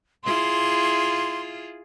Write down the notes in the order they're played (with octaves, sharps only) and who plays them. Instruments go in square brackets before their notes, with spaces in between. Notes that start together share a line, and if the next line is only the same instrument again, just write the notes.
[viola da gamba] E4 F4 G#4 [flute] C6